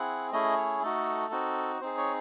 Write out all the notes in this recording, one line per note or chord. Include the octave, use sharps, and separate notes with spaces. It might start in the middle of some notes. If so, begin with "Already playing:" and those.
Already playing: C4 E4 G#4 F#5
A3 C#4 E4 G#4 D#5
C#5
A3 D#4 F#4 A4
C4 D#4 F#4
C4 D#4 G#4 C5
C#5